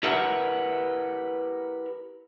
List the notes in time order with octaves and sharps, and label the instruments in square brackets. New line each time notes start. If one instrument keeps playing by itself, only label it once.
[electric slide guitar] E4 G4 A#4 B4 E5 F#5